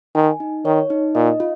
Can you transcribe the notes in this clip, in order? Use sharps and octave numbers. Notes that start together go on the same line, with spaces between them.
D#3 G#5
D#4
D#3 C#5
D#4
A#2 D#5
F4